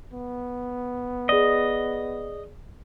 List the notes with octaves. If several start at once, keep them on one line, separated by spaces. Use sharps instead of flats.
B3
G#4 D5 D#5